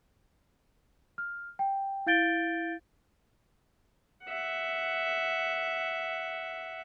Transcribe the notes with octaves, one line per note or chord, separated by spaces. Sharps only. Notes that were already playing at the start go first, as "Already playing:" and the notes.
F6
G5
E4 F5 G6 A6 D7 G7
E5 F#5